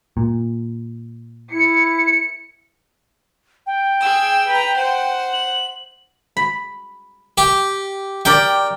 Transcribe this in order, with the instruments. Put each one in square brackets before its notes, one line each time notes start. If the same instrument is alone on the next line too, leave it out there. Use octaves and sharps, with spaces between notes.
[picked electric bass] A#2
[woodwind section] E4 [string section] C#7
[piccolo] G5
[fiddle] G#4 E6
B4 A#5
C5 F#5
[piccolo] F#7
[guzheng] B5
[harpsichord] G4
[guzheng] G4 A#4 D5 [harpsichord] G5